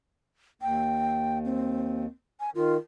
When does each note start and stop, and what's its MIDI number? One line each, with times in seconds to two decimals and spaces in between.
0.62 2.06 39
0.62 1.39 79
1.45 2.05 60
2.40 2.50 80
2.55 2.77 51
2.55 2.74 65